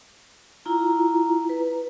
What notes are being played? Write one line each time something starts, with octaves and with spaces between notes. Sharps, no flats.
E4 F4 A#5
B4